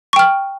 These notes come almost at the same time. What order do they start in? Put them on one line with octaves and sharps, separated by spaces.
C#6 G5 F6